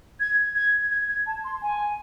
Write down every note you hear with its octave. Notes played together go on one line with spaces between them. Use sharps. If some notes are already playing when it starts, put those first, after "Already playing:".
G#6
G#6
G#6
G#6
A5
C6
G#5